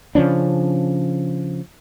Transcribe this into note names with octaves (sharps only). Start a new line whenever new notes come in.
C#3 F3 C#4 D4